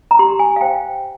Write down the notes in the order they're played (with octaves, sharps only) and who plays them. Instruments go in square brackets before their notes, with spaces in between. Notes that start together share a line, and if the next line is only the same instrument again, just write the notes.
[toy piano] A#5
G4 C6
G#5
F5
C5 G5